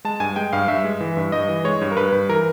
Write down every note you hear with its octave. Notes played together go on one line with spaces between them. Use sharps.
G#3 A5
G2 G#5
G#3 G5
G2 F5
G2 E5
G#3
E3
G2
G2 D#5
E3
G#3 C#5
G2
A#4
G2 B4
G2
E3 A#4